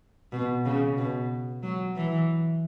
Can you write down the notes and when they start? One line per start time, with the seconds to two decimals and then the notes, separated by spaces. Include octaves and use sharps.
0.32 B2
0.65 C#3
0.97 B2
1.63 F#3
1.96 E3